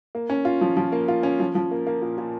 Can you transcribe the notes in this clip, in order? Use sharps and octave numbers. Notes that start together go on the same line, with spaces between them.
A#3
C#4
F4
F3
F3
A#3
F4
C#4
F3
F3
A#3
A#3
A#2
A#2